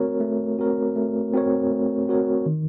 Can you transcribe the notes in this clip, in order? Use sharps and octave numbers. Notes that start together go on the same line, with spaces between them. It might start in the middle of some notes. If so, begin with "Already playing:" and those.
Already playing: A3 C4 F#4 A#4 C#5
A3
C4 F#4 A#4 C#5
A3
C4 F#4 A#4 C#5
A3
C4 F#4 A#4 C#5
D#3